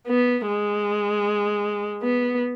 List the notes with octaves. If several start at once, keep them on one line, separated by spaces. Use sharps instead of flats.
B3
G#3
B3